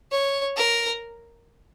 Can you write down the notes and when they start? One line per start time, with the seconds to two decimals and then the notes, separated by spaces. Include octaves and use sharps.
0.12 C#5
0.57 A#4